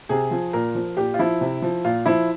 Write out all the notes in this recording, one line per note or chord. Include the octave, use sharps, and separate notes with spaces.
C3 G#4
F3
A#2 A#4
F3
A#2 G4
F4
F3 E4
C3
F3
A#2 F4
F3 E4